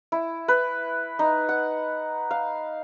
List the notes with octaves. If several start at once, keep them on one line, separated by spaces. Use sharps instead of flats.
E4
B4
D#4
F#5
F5